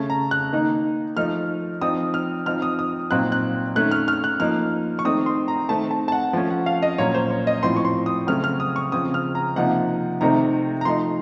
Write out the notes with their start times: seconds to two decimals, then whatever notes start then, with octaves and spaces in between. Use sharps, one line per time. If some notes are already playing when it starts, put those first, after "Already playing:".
Already playing: C#3 A3 C#4 A5
0.10 A#5
0.31 F#6
0.53 D#3 A#3 D#4
1.17 F3 A3 D#4 F6
1.81 F3 C4 D#4 D#6
2.14 F6
2.46 F3 C4 D#4 F6
2.62 D#6
2.79 D#6
3.11 A#2 F#3 C4 D#4 F#6
3.32 F#6
3.75 D#3 A3 C#4 F#6
3.91 F6
4.08 F6
4.24 F#6
4.40 F3 A#3 D#4 F6
4.99 C#6
5.05 D#3 A3 C4 D#4 D#6
5.26 C6
5.48 A#5
5.69 D#3 A3 C4 A5
5.91 A5
6.08 A5
6.12 F#5
6.33 F3 A3 C#4 A5
6.50 F#5
6.66 F5
6.82 D#5
6.98 A#2 F#3 A#3 C#4 C#5
7.14 C5
7.31 C#5
7.47 D#5
7.63 A2 F3 C4 C6
7.76 C#6
7.85 C6
8.06 D#6
8.27 C#3 F#3 A3 C4 F6
8.44 F6
8.60 D#6
8.76 C#6
8.92 C#3 F3 C4 D#6
9.14 F6
9.35 A#5
9.56 C3 F3 A#3 D#4 F#5
10.21 C3 D#3 A3 C4 D#4 A#5
10.81 A#5
10.85 F3 A3 D#4 C6